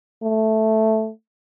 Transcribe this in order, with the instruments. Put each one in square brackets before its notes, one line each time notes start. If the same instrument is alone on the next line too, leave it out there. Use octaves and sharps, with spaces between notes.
[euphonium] A3